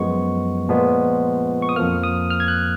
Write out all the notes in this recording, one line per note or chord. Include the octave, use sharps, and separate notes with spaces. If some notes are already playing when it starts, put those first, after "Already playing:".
Already playing: F#2 F3 G#3 B3 C#6
A#2 F3 G#3 B3
C#6
D#6
F2 F3 A#3 F6
D#6
F6
G#6
F#6